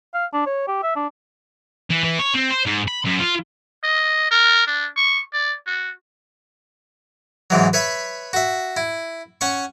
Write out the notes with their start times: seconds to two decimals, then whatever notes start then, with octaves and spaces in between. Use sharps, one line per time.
0.14 F5
0.33 D4
0.46 C#5
0.68 G4
0.83 E5
0.96 D4
1.90 E3
2.04 E3
2.19 C#5
2.35 C4
2.51 C5
2.66 G#2
2.88 B5
3.05 F#2
3.20 F4
3.84 D#5
4.31 A#4
4.67 D4
4.97 C#6
5.33 D5
5.67 F#4
7.50 G#2 E3 F#3
7.73 B4 C#5 E5 B5
8.33 F#4 E5
8.77 E4
9.41 C#4 F#5 C#6